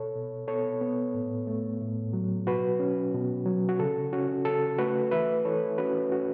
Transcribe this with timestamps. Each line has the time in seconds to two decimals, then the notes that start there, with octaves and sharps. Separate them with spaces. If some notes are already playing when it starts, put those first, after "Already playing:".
Already playing: B2 A4 C#5
0.15 B2
0.48 B3 A4 C#5
0.81 B3
1.14 A2
1.47 A3
1.81 A2
2.13 F#3
2.47 B2 F#4 B4
2.80 C#4
3.14 B2
3.46 F#3
3.69 F#4
3.79 C#3 A4
4.12 C#4 F#4
4.45 C#3 A4
4.78 A3 F#4 B4
5.11 E3 B4 E5
5.45 E3 A4 C#5
5.78 C#4 F#4 B4
6.12 C#4 F#4